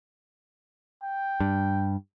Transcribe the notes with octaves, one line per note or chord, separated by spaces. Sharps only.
G5
G2